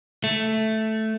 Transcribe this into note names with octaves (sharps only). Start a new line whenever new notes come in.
A3